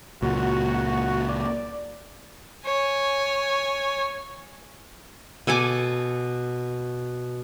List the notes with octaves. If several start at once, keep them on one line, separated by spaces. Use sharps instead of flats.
C#2 A#2 F#4
D5
C#5 G#5
B2 A4 G#5 D6